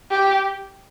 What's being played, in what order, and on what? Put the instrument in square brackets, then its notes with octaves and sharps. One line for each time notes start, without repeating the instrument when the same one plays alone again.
[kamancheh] G4